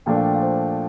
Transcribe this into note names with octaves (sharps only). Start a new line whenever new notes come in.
A#2 F3 A3 D4 G5
F5
G5
F5
C5